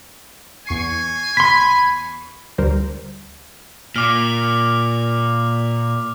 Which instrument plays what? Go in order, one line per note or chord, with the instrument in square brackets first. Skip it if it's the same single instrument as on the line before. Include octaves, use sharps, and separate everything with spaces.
[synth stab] E2 C#6 C7 [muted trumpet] G#5
[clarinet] B5 [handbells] C6 B6
[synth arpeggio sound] D2 G3 A#4 C5
[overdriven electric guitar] A#2 [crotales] D6 F6